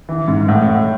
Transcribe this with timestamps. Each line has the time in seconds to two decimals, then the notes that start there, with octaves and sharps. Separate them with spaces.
0.09 E3
0.28 G#2
0.48 A2
0.68 A2